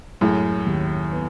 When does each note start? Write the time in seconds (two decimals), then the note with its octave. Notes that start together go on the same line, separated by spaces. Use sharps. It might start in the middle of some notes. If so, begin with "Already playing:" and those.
0.21 F#2 A2 G#3
0.66 D#2
1.11 B3